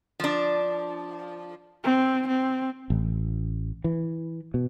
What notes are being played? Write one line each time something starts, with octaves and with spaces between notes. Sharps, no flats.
F3 D4
C4
C4
A1
E3
B2